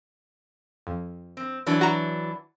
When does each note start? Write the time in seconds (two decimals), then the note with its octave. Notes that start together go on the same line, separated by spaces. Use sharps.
0.87 F2
1.37 C4
1.67 E3 F#3 D4
1.81 F#4 A#5